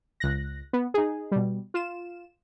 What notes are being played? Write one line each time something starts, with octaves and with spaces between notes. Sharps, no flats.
C#2 F#6 A#6
B3
D#4 G#4
B2 G3
F4 E7